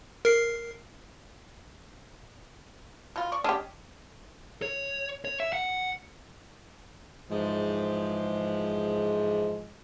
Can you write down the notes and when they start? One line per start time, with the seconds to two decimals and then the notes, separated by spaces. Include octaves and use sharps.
0.25 A#4 C7
3.16 B2 F4
3.32 D5 C#6
3.44 C#4 D4 G4 D#5
4.62 C#5
5.25 C#5
5.40 E5
5.53 F#5
7.30 G#2 E3 F3 G#3